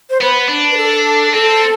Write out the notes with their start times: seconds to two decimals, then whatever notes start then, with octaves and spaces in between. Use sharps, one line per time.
0.10 C5
0.21 B3 B4
0.49 D4
0.71 B4
0.77 A4
1.34 C4 A4